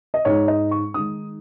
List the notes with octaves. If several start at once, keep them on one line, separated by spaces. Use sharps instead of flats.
D#5
G#2 G#3 D#4 C#5
D#5
C#6
D#3 G#3 D#4 D#6